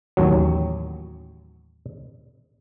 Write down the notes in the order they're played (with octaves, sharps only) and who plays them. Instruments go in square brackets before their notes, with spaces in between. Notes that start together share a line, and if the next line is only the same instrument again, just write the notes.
[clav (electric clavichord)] A1 D#2 F#3